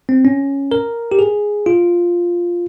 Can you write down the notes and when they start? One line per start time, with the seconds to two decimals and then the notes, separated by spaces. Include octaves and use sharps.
0.09 C4
0.25 C#4
0.72 A#4
1.12 G4
1.19 G#4
1.66 F4